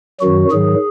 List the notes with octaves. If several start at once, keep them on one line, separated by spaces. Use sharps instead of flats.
F#2 D#3 F#3 F#4
G#2 D#3 F#3 G#4